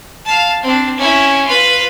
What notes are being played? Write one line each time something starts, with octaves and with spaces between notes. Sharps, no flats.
F5 A5
C4 D4
C#4 E4
F4 B4